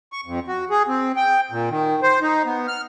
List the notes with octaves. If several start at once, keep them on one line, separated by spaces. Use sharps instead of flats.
C#6
F2
F#4
G#4
C4
G5
A#2
D#3
C5
D#4
B3
F6